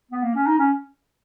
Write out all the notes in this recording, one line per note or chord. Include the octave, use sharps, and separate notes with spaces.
B3
A#3
C#4
D#4
C#4